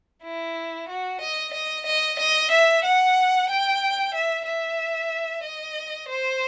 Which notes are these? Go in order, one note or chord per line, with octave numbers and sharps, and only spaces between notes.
E4
F#4
D#5
D#5
D#5
D#5
E5
F#5
G5
E5
E5
D#5
C5